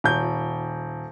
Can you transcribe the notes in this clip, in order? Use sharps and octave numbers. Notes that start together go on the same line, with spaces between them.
D#1 G6